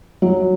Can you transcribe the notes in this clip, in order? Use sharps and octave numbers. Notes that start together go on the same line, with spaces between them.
F#3